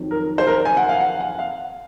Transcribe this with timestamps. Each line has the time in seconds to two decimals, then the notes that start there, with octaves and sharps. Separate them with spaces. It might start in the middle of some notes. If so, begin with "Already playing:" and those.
Already playing: F2 D#3 F#3
0.11 A#4
0.38 C5
0.47 A#4
0.65 G#5
0.77 F#5
0.89 F5
1.00 F#5
1.20 F#5
1.39 F5